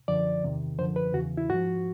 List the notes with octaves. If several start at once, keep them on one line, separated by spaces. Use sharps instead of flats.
F#2 D3 F3 D5
E2 C3 D#3
F#2 D3 F3 C5
B4
E2 C#3 E3 F#4
E4
G#2 F3 F#4